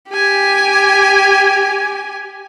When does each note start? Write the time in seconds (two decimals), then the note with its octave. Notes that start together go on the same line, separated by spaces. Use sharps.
0.10 G4 G#5